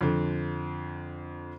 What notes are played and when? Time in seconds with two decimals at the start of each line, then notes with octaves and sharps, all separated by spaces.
0.01 F2 D3